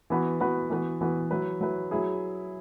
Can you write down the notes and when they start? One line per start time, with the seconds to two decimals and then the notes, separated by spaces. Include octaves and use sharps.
0.10 E3 B3 F#4 B4
0.41 E3 B3 F#4 B4
0.70 E3 B3 F#4 B4
1.01 E3 B3 F#4 B4
1.31 F#3 E4 B4
1.61 F#3 E4 B4
1.91 F#3 E4 G#4